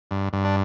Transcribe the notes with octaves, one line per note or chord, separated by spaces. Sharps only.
G2
G2
D4